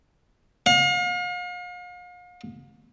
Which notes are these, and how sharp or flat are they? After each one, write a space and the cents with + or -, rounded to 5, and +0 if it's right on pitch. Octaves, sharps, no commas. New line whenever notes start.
F5 +40